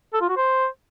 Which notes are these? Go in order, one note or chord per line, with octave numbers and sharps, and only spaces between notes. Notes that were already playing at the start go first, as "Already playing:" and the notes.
A4
F4
F#4
C5